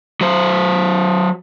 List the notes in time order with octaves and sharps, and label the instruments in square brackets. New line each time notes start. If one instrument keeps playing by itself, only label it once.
[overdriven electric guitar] F#3 C5